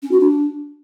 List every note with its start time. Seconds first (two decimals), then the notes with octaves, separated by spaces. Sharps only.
0.03 C#4
0.11 F#4
0.20 D4